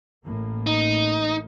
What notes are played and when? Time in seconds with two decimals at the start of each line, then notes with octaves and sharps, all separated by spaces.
0.24 A1 A2 A#3
0.67 D#4